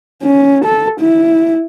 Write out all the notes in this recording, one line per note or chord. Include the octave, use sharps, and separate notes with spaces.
C#4
A4
E4